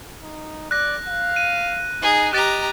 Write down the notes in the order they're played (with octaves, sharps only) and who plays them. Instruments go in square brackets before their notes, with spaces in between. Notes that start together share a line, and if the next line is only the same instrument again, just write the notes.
[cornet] D#4
[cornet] D5 [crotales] F#6 A#6
[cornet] F5
[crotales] D#7
[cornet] D#4 [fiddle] G#4
[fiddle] G4 A#5 [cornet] D#5 [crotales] F#6 A6